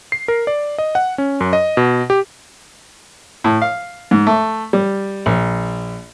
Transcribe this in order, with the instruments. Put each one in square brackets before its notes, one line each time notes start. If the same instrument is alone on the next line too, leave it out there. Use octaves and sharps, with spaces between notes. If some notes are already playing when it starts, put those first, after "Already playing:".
[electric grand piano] C7
A#4
D5
D#5
F#5
C#4
F#2
D#5
B2
G4
[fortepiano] A2
F5
G#2
A3
G3
A#1